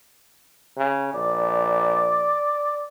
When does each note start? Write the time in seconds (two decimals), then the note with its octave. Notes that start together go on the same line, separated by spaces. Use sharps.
0.77 C#3
1.14 A#1 D5